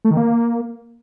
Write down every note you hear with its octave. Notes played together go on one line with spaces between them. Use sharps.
A3
D#3
A#3